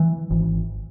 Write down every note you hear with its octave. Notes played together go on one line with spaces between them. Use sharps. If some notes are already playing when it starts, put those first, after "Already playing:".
Already playing: E3
G#1